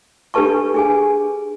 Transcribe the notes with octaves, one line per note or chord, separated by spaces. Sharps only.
D4 G4 A4 B4 A5 C#6
D4 G#4 G#5